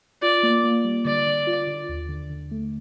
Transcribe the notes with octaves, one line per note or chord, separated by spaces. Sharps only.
F4 D5
A#3
A#3
G3
D3 D5
D3
F4
D3
D#2
D3
D3
A3